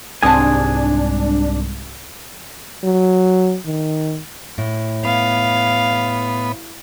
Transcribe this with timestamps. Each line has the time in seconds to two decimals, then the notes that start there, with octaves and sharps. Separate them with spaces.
0.23 C2 G#2 F#3 C4 D4 G#5 A5 D#6
2.84 F#3
3.66 D#3
4.58 A2
5.05 B3 F5